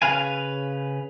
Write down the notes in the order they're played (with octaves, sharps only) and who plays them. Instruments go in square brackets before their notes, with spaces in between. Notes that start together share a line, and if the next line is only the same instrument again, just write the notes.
[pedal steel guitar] C#3 B4 F5 G#5